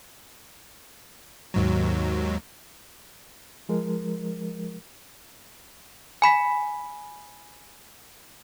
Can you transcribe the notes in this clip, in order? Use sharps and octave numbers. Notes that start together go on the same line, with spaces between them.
D#2 G#2 F#3
F3 G#3 A#4
G#5 B5 B6